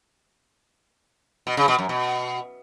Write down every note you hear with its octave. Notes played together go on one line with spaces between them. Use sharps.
B2
C#3
B2
F#2
B2